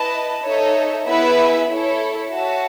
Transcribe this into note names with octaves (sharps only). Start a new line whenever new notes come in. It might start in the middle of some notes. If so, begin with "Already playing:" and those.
Already playing: E4 B4 D#5 A5
D#4 A4 C#5 E5
B3 E4 G#4 B4 E5
E4 A4 C#5
F#4 C#5 E5 A5